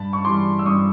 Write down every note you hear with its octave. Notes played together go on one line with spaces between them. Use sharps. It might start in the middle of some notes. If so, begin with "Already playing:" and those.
Already playing: G2 A5 B5
C#6
E3 G3 C6 D6
E6
G2 C#6 D#6